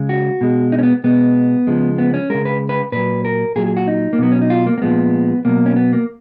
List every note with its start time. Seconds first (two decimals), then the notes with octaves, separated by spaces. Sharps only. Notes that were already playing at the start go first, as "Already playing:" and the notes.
Already playing: C#3 G#3
0.09 F#4
0.41 B2 G#3
0.72 D#4
0.79 C#4
0.83 B3
1.04 B2 G#3 B3
1.67 C#3 F3 G#3
1.98 B3
2.14 C#4
2.30 C#3 G#3 A#4
2.45 B4
2.69 B4
2.92 A#2 F#3 B4
3.25 A#4
3.56 A#2 F#3 G#4
3.66 G#4
3.77 F#4
3.88 D#4
4.13 A#3
4.18 B2 F#3 B3
4.32 C#4
4.42 D#4
4.50 F4
4.66 A#3
4.78 A#3
4.82 A#2 F3 G#3 B3
5.45 B2 F#3 A#3
5.66 C#4
5.76 B3
5.92 A#3